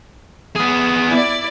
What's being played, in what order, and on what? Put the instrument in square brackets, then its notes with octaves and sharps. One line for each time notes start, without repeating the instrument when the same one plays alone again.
[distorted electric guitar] B3 G#4
[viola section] E4 D5